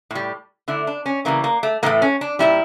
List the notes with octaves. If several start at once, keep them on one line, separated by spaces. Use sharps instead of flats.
A2 G3
D3 A3 E4
D4
C#4
C#3 E3 G3 A#3
A#3
A3
A2 E3 A3 A#3
C#4
D4
A#2 G3 E4